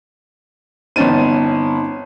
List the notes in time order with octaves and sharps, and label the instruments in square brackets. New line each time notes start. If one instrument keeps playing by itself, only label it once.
[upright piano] G1 C#4 D#7 [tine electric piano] C4 D#4 A5